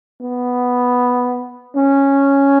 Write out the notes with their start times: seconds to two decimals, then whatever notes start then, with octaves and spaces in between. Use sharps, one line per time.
0.21 B3
1.76 C#4